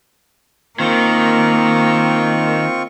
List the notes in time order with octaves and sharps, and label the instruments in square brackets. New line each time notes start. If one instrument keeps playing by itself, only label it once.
[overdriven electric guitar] D#3 [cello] A#3 [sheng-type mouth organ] C4 F4 C#6